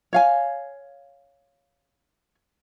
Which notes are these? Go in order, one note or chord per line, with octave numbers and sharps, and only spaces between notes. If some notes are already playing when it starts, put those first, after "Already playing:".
C#5 F5 G#5